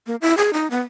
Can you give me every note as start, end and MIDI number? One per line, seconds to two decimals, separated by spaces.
0.07 0.16 58
0.21 0.36 64
0.37 0.51 68
0.53 0.70 63
0.70 0.81 59